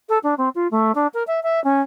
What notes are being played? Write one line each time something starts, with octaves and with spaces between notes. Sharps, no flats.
A4
D4
C4
F4
A3
D4
A#4
E5
E5
C#4